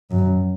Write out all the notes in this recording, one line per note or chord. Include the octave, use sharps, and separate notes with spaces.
F#2